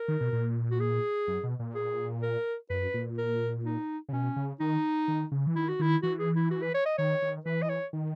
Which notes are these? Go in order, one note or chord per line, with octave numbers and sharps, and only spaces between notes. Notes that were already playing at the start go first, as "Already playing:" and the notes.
Already playing: A#4
D#3
B2
A#2
F#4
G#4
F#2
B2
A#2
G#4
A#4
F#2 B4
A#2
A#4
D#4
C#3
B2 C#4
C#3
D#3 D#4
D#3
C#3
E3
D#3 E4
F#4
D#3 E4
E3 F#4
G#4
E4
F#4
B4
C#5
D#5
D#3 C#5
D#3
E3 B4
D#5
C#5
D#3